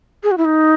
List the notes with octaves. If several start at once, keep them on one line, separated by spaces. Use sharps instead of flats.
G#4
F#4
E4
D#4